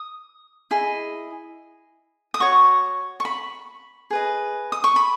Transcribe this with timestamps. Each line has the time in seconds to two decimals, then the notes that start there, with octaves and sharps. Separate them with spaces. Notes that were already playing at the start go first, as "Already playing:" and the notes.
Already playing: D#6
0.71 E4 G#4 D#5
2.34 D#6
2.40 F#4 C#5 C#6
3.20 C#6
3.25 B5
4.10 G#4 B4 D#5
4.72 D#6
4.84 C#6
4.96 B5